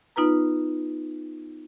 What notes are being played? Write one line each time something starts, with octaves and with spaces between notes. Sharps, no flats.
B3 D#4 F4 B4 A#5